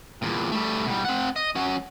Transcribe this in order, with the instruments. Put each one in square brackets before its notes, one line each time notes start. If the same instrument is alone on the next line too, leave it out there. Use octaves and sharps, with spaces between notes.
[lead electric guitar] E2 A#2
G3 A3
B2 G3
C4 F#5
D#5
F#3 C#4